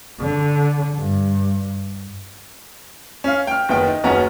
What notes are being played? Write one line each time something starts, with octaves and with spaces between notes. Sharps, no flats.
D3
G2
C#4 F5
G5 F6
F#1 D#3 B3 G5
D#4
F#1 D#2 B3 C#4 F#4 A#5